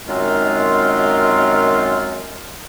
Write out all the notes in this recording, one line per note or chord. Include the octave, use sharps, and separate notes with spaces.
F#2 D#3 G#3 C4 D#4 F4